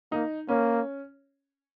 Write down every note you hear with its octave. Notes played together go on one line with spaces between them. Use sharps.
A#3 D#4
A#3 C#4